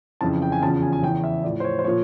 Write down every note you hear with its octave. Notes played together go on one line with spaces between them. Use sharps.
F2 C#3 E3 A5
G5
G#5
E2 C#3 F3 A5
G#5
G#5
E2 C#3 E3 G5
E5
A2 F3 D5
C5
C#5
C5
A#2 F3 C#5